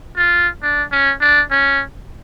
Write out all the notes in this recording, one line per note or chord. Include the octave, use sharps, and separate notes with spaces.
F4
D4
C#4
D4
C#4